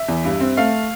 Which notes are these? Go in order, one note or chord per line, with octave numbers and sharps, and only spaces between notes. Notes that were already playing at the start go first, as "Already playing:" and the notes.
Already playing: E5
E2
G2
C4
A3 F5